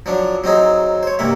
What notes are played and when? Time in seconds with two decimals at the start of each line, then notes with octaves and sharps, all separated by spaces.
0.06 F3 F#3 D4
0.44 F#3 C4 D#4 G#4
1.03 C5 C#5
1.19 G2 C3 A#3 E5